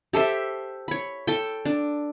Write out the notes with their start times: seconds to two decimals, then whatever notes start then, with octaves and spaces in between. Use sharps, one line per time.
0.13 G4 A4 C5 E5
0.88 C#5 B5
1.27 A4 G5
1.65 D4